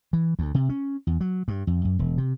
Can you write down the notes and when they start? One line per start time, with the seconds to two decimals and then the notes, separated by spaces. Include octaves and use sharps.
0.13 E3
0.39 D2
0.55 C3
0.69 C#4
1.07 E2
1.21 F#3
1.48 G2
1.67 F2
1.85 F#2
1.99 E1
2.18 C3